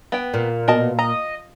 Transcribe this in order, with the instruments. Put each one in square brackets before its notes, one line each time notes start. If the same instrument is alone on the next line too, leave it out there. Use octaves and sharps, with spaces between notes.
[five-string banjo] B3 G5
[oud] A#2
[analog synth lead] B2 [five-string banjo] A#4 D#5 A5
[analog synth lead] D#5 [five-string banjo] A#5